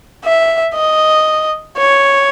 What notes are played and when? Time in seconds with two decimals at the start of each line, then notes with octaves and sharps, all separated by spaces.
0.25 E5
0.75 D#5
1.77 C#5